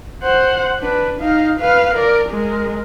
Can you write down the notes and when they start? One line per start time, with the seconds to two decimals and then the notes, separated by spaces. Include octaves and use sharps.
0.23 C5 F#5
0.79 D4 B4
1.20 D#4 F5
1.60 B4 F5
1.95 A#4 D5
2.29 G#3 A#4